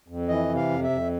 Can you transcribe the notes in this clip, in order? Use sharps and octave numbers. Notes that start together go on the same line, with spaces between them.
F2
E3 D#5
C3
F5
F2
E5
F2